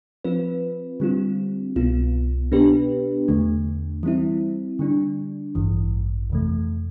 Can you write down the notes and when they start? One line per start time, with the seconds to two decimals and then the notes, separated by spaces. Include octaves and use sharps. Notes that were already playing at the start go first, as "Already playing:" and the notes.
0.24 F3 C4 F4 B4
1.00 D3 G3 C4 F4
1.76 C2 B2 B3 F4
2.52 B2 B3 D4 G4 B4
3.28 E2 D3 A3
4.03 E3 G3 C4 E4
4.79 D3 G3 D4
5.55 A1 G2 E3
6.30 F2 C3 E3 A3